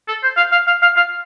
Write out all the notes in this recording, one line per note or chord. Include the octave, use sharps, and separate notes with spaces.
A4
C5
F5
F5
F5
F5
F5